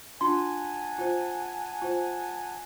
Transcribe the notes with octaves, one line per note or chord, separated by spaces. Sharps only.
D4 F4 F#5 G#5 A5 C6
F4 C5
F4 C5